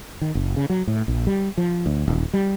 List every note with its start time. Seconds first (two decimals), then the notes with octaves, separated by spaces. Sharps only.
0.21 D#3
0.35 F#1
0.56 C#3
0.70 F#3
0.87 A2
1.08 A#1
1.27 G3
1.58 F3
1.86 D2
2.08 D#1
2.33 G3